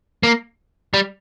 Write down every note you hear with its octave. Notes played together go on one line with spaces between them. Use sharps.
A#3
G3